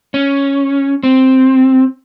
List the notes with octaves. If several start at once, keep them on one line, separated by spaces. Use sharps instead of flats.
C#4
C4